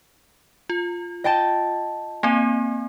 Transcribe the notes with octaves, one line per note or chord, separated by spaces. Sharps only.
F4
D#5 G5 A5
A#3 C4 G#5